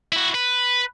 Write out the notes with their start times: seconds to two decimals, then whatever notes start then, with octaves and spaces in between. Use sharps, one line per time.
0.12 E4 F#4
0.34 B4